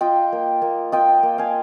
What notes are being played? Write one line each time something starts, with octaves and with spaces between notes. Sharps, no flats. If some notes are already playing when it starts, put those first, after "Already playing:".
F4 D#5 G5
A#3
A#3
F4 D#5 G5
A#3
F5 G#5